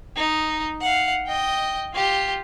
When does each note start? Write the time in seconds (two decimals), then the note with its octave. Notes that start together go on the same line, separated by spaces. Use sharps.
0.16 D#4
0.81 F5 F#5
1.27 D#5 G5
1.94 F4 G4